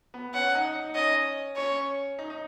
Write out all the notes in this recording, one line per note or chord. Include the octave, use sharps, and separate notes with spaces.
B3
C#4 F#5
D#4
D#4
C#4 D#5
C#4 C#5
D#4
D#4